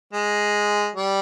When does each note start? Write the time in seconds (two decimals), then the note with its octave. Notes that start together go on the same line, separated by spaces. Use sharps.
0.13 G#3
0.96 G3